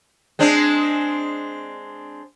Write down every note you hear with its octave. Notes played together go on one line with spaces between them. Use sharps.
G#3 C4 D4